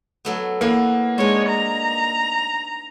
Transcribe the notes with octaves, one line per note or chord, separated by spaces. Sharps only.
F#3 A3 B3
E3 A#3 B3
G#3 D4 D#4 C#5
A#5